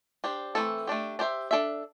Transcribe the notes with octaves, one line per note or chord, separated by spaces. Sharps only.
D4 G4 C5
E3 A3 C4 A4
A3 D4 G4
D4 G4 C5 E5
D4 A4 E5